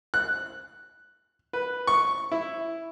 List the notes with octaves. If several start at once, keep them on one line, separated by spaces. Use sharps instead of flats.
F#6
B4
C#6
E4